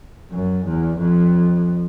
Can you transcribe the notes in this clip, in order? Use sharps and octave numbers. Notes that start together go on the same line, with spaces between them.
F#2
E2
F2